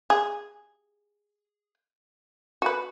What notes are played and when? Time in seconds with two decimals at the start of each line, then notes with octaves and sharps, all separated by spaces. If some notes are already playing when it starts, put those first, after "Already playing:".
0.10 G#4
2.62 F#4 B4